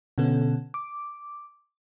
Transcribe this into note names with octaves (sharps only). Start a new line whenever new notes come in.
B2 D3 B3 C#4 A4
D6